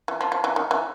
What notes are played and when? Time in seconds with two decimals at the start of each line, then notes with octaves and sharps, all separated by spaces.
0.08 E3
0.21 F3
0.32 F3
0.44 E3
0.56 D#3
0.71 E3